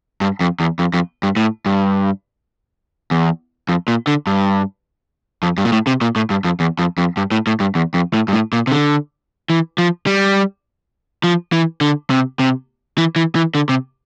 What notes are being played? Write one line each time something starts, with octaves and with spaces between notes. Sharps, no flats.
G2
F2
E2
F2
F2
G2
A2
G2
E2
F2
A#2
D3
G2
F2
G2
A#2
A2
C3
A#2
A2
G2
F2
E2
F2
F2
G2
A2
A2
G2
E2
F2
A2
G2
A2
A#2
C3
D3
E3
F3
G3
F3
E3
D3
C3
C3
E3
E3
E3
D3
C3